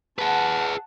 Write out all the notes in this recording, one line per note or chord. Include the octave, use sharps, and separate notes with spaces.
G#4 B4 F#5 A5